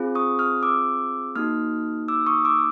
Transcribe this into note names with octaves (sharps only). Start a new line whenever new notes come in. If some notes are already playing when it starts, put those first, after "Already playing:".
Already playing: C4 F4 G#4
C#6 D#6
D#6 F6
D6 E6
A#3 D#4 F#4 D#6 F6
D6 E6
C#6 D#6
D6 E6